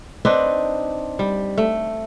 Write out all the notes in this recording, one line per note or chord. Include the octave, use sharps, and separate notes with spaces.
C4 D4 D#4 B4
G3
A3